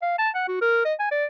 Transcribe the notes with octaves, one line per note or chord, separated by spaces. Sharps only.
F5
A5
F#5
F#4
A#4
D#5
G#5
D5